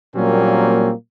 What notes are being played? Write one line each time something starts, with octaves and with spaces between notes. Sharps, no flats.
A#2 F#3 G3 A#3 C4 C#4